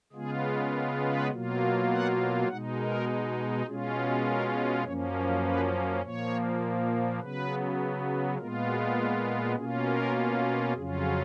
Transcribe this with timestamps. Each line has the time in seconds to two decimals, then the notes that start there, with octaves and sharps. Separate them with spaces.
0.13 C#3 G#3 B3 F4 G#4
0.72 A#4
1.01 B4
1.30 B2 F#3 A#3 F4
1.89 F#5
2.48 B2 G#3 D#4 F#5
2.78 A#4
3.66 B2 G#3 C#4 F4 G#4
3.95 F#4
4.25 A#4
4.84 F#2 F3 A#3 C#4 C#5
5.14 C#5
5.43 B4
6.02 A#2 F3 A#3 C#5
7.19 C#3 F#3 B3 B4
8.37 A#2 G#3 B3 F4 A#4
8.67 F#4
8.96 G#4
9.27 A#4
9.56 B2 A#3 C#4 F4 G#4
9.85 A#4
10.73 F2 C#3 F#3 C#4 F4 G#4